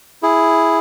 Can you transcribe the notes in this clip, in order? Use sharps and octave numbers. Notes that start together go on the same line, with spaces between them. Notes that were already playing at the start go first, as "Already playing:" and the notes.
E4 G#4